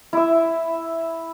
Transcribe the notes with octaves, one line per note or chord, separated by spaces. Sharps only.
E4 E5